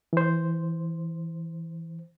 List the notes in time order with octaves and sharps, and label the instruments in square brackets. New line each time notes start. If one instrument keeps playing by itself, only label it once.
[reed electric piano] E3 C5